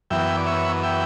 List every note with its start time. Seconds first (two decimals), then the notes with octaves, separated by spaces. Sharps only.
0.11 F#2 E3 B3 E5 G5
0.37 D5
0.47 C#5 E5
0.83 E5 G5